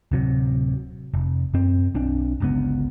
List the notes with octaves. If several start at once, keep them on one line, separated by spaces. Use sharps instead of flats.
D1 C3 F#3
F1
F#2 C4
B1 C4 D4
G1 C#2 B3